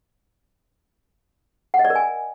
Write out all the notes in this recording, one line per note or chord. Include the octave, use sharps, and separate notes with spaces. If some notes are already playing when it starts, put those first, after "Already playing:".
F#5
D#5
D5
A#4
G#5